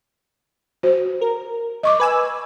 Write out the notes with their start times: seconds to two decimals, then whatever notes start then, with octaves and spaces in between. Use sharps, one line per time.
0.83 F#4 C5
1.21 A#4
1.83 D#5 C#6 D6
2.00 B4 G#5 E6